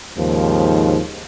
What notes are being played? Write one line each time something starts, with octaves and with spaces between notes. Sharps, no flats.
D#2 G#2 C#3 F3